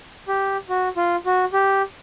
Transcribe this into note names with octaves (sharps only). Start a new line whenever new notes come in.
G4
F#4
F4
F#4
G4